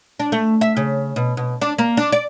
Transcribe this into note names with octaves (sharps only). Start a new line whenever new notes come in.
D4
A3
E5
C#3
B2
B2
D4
A#3
D4
D5